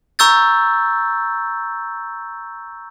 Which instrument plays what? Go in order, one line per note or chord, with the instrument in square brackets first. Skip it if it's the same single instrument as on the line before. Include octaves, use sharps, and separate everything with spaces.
[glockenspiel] A#5 C#6 E6 G6 A6